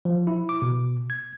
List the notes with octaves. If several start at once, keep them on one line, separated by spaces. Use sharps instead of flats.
F3
E4
D6
B2
G#6